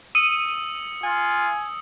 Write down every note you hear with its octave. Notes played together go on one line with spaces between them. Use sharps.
D#6 E6 C#7 D#7
F4 G#5